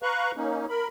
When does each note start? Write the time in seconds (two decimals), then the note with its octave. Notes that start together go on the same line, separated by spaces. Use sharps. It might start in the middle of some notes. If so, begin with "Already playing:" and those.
0.03 B4 F5 A#5 C#6 F#6
0.36 A#3 C#4 D#4
0.69 A#4 B5